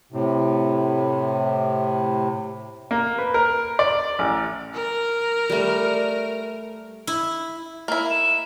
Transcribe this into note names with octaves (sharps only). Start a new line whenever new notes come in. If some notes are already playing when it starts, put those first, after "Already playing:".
A2 C3
A#3
B4
A#4
D5
A1
A#4
G3 A3
E4
A#3 E4
E7